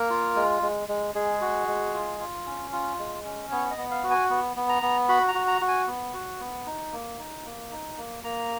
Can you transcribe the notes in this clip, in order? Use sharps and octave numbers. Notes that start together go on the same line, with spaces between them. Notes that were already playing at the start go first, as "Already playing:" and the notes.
Already playing: A#3 A#4
F4
G#3
G#3
G#3
G#3 G#4
F#4
G#3
F4
F4
C#4
F4
G#3
C#4
B3 C#5
D#5
B3
F5
F#4
G#5
B3
B3
A#5
B3
F#4 B5
A#5
F#4
A#5
F#4
G#5
B3
F#4
B3
D#4
A#3
D#4
A#3
D#4
A#3
A#3 A#5